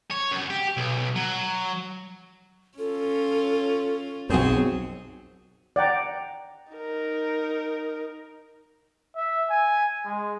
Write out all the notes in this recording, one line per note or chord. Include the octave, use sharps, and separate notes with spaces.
C#5
F#2
G4
B1
F#3
C#4 F4 A4
B1 F#2 F#3 C4 G#4
D5 F#5 G5 A#5
D#4 A#4
E5
G#5
G#3